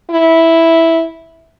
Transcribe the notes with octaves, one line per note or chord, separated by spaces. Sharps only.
E4